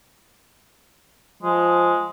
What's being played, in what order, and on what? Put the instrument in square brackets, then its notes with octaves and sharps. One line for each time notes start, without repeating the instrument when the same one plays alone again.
[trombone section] F3 [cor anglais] G#3